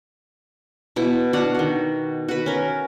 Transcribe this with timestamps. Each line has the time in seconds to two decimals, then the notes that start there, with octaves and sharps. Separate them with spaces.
0.96 B2 E4
1.33 D4 F#4 F5 F#5
1.55 D#3 F#4
2.28 F#4 B4
2.46 C#4 A#4